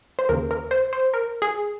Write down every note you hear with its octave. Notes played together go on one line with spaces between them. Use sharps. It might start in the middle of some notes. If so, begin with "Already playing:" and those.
C5
D#2 C#3 A#4
A#4
C5
C5
A#4
G#4